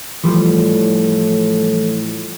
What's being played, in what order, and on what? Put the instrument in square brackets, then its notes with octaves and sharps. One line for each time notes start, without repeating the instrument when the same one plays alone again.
[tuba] A2 [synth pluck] E3 F3 G3